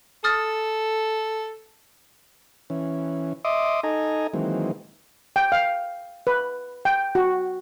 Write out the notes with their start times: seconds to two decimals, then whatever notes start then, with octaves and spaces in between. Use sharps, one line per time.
0.24 A4 D#6 F6 A6
2.70 E3 C#4
3.45 D#5 E5 C6 D6 D#6
3.84 D#4 A4 D#5 G#5 A#5
4.34 D#3 E3 F#3 G#3 A#3 C4
5.36 G5
5.52 F5
6.27 B4
6.85 G5
7.15 F#4